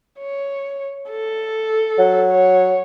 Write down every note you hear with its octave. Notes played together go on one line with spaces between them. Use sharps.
C#5
A4
F#3
C#5